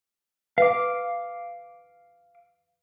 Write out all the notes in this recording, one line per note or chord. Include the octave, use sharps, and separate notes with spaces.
B4 F5 D6